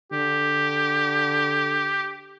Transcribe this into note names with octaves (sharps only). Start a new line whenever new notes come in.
D3 G4